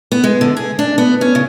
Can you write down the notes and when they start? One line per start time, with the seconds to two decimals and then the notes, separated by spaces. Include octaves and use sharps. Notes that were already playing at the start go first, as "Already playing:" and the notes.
0.12 B3
0.24 G#3
0.41 D3
0.57 G#4
0.79 D4
0.98 B3
1.21 C#4
1.35 C#3